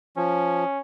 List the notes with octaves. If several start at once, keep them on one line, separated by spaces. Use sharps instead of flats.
F3 C#4